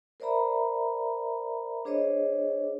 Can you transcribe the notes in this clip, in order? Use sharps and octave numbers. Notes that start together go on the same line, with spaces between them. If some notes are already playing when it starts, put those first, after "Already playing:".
A#4 C5 D5 E5 A#5 B5
D4 G#4 C5 C#5 D#5